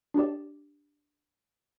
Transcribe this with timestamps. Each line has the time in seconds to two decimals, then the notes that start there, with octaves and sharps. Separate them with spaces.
0.14 D4 G4 D5